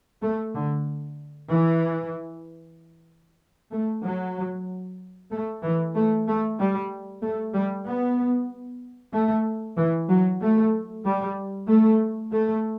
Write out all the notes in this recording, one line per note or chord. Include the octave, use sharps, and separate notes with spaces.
A3
D3
E3
A3
F#3
A3
E3
A3
A3
G3
A3
G3
B3
A3
E3
F#3
A3
G3
A3
A3